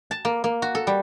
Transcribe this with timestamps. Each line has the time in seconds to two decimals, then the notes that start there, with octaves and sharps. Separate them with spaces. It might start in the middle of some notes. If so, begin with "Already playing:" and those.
0.11 A5
0.25 A#3
0.44 A#3
0.62 F#4
0.75 A4
0.87 G3